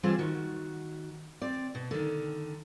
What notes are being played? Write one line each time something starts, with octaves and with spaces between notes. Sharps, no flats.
E3 G3 C4 F4 G#4 C5
D#3 F#4
C4 D5
B2
D3 D#3